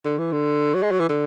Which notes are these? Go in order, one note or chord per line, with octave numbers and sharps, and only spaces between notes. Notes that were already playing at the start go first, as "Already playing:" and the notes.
D3
E3
D3
F#3
G#3
F#3
E3
D3